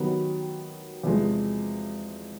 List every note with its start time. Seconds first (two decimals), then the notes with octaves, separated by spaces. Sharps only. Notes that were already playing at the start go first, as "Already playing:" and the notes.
Already playing: D#3 F#3 B3 D#4 G4
1.04 E2 C3 F3 G#3